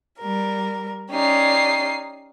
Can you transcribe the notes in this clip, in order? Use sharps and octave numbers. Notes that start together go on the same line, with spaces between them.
G3 A#4
C#4 D#4 G4 D5 C7